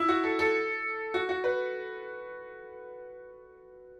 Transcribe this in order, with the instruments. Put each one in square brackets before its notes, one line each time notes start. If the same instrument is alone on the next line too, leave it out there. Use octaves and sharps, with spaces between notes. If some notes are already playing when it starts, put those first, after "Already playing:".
Already playing: [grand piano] E4
F#4
A4
A4
F#4
F#4
B4